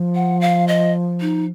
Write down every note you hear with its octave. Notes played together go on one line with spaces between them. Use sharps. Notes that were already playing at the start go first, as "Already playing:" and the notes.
Already playing: F3
F#5
F5
D#5
D#4